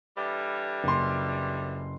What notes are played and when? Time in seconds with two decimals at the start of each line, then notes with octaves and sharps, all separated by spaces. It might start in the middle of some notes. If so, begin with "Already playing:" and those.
0.17 D3 E3 G3
0.84 F#1 C6